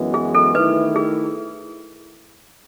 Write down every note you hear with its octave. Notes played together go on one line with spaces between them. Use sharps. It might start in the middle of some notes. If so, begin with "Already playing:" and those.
Already playing: F#2 E3 G#3 B3
G#4
A4
D#3 A3 E4 B4
G#4